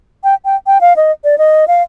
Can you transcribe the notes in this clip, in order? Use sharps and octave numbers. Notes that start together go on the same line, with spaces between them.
G5
G5
G5
F5
D#5
D5
D#5
F5